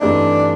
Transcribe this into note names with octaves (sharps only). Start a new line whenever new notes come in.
G2 E3 A3 C4 D4 D#4